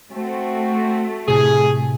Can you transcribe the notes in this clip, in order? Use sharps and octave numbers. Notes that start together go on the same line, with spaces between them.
A3 C4 F#4
A2 C3 G#4